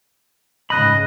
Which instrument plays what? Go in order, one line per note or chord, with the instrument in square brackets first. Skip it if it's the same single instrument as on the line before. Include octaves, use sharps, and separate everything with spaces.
[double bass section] G#2 C#3 [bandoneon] D#5 [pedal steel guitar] B5 F#6